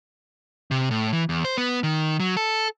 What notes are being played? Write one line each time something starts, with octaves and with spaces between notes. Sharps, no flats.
C3
A2
E3
E2
C5
B3
D#3
F#3
A4